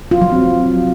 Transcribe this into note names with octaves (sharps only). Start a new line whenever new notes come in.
F4
F#3
C4